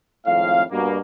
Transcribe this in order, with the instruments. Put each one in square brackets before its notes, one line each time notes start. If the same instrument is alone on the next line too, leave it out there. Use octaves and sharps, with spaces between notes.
[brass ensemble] G#1 F2 A2 F5
G2 B2 A#3